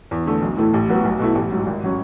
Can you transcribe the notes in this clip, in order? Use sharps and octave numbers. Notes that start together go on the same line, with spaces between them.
E2
D3 A3
B1
A2 E3 A3
A1
A2 F#3 B3 F#4
B1
B2 A3 E4
A1
G#2 F#3
G#1
F#3 C#4